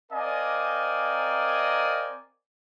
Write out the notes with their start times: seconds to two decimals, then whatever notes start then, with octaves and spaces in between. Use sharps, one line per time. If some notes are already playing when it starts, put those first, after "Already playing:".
0.12 C4 A#4 D5 D#5 F5 G#5